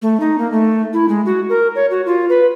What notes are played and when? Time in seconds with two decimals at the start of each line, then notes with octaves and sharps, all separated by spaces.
0.02 A3
0.20 D#4
0.39 A#3
0.52 A3
0.93 E4
1.09 G#3
1.26 F#4
1.49 A#4
1.75 C#5
1.90 F#4
2.06 F4
2.29 B4